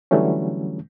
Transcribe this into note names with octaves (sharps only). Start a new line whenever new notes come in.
D3 E3 F#3 G3 A3 C#4